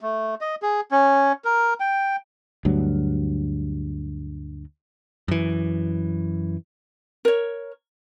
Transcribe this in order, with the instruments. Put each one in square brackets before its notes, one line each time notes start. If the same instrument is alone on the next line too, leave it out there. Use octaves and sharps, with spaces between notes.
[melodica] A3
D#5
G#4
C#4
A#4
G5
[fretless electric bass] D2 G2 F#3
[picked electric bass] F#2 E3
[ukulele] A#4 C#5